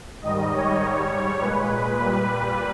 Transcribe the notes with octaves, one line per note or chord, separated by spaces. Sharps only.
G#2 D#3 G3 D#5
C#5
G#2 G3
A#2 G#3 B4
B4
A#2 G3 B4